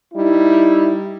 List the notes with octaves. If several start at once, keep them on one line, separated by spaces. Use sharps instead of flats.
G3 D#4 E4